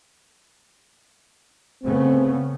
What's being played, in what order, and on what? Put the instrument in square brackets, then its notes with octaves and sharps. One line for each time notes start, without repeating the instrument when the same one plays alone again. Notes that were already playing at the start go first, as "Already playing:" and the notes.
[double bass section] C#3 A3 B3 [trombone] C4